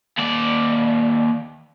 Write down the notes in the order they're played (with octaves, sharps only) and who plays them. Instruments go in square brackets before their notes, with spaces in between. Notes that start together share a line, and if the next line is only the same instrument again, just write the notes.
[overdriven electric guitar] D#2 D5